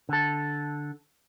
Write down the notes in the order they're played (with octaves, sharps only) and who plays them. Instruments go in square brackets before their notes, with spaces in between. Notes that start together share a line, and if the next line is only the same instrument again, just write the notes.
[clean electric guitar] D3 A4